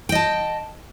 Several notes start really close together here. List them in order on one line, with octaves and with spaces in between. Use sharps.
G5 D#5 A5